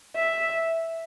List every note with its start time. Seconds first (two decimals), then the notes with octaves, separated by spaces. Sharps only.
0.16 E5